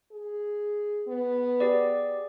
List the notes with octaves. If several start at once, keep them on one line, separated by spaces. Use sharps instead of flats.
G#4
B3
G4 G#4 D5